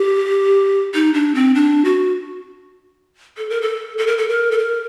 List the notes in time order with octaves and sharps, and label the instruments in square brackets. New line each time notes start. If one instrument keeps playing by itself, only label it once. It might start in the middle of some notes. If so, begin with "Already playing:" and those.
Already playing: [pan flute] G4
D#4
D4
C4
D4
F#4
A4
A#4
A4
A4
A#4
A4
A#4
A4
A#4